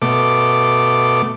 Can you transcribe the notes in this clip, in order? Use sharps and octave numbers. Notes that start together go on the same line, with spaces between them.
B2 A3 D6